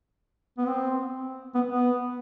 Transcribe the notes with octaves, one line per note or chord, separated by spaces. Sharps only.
B3
C4
B3
B3